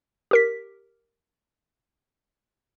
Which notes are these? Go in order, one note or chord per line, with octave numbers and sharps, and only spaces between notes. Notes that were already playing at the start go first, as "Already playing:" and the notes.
G4 A#4 B6